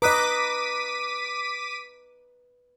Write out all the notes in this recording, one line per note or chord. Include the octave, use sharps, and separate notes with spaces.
B4 D#5 A#5 D6 D#6 F#6 B6 D#7